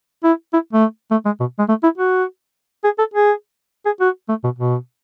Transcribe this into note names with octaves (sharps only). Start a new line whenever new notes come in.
E4
E4
A3
A3
G#3
B2
G#3
A3
E4
F#4
G#4
A4
G#4
G#4
F#4
A3
B2
B2